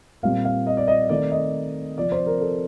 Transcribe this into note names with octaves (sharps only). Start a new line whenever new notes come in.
A#2 G3 C4 F5
F5
D#5
D5
D#5
D#3 A3 C4 D5
D#5
C3 F3 C4 D5
C5
A#4
A4